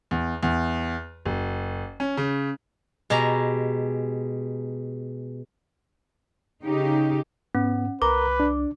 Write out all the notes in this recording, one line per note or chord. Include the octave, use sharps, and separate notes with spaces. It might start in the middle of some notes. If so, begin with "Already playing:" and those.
E2
E2
F#1
C#4
C#3
B2 G#3 G4 G#5 A#5
C#3 D#4 G4
G#2 B3 C#4
C2 A#4 B4 A#5 D6
D4